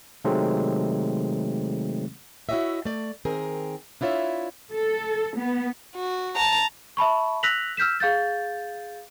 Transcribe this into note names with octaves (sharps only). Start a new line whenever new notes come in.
C3 D#3 F#3 G#3 A3 C4
E4 F#4 G4 C#5 D#5 E5
A3 D5
D#3 C4 G#4 A#4
D4 E4 F4 C#5 E5
A4
B3
F#4
A5 A#5
E5 A5 B5 C#6
E6 F#6 A#6 B6 F7 F#7
E6 F6 G6 B6 E7
G#4 F5 G6 A6